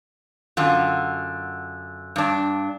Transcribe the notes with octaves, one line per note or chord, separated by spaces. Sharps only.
F#2 D3 F4
G2 D4